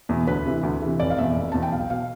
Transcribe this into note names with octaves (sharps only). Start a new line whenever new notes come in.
E2 B2
D2 B4
C3 E3
D2
C3 E3
F1 D5
F5
E2 B2 E5
F1
E2 B2 A5
G5
B1 F5
B2 F5